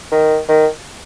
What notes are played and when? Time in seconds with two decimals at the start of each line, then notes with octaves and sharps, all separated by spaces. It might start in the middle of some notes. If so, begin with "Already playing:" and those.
0.12 D#3
0.49 D#3